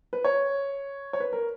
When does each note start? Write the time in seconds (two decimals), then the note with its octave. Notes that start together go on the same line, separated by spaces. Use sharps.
0.13 B4
0.24 C#5
1.13 C#5
1.20 B4
1.33 A#4